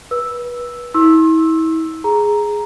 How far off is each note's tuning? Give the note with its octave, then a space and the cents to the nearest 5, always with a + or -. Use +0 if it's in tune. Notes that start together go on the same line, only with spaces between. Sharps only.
B4 -25 E6 +0
E4 -40 C6 +35 E6 +0
G#4 +0 A#5 +0